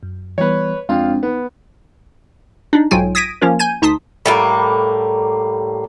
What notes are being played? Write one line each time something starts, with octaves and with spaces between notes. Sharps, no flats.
F#2
E3 G3 B3 B4 C#5
F2 G#3 C4 D4 F4
B3 D#4
D4 D#4
B1 G#2 F#3 F4 G5 G#5
D#6 G#6 A#6 B6 D7 D#7
F3 A#3 C#4 F4 A#4
G#5 G6 G#6 D#7
D2 D#4 A5 C6 D#6 B6
A2 G3 A#3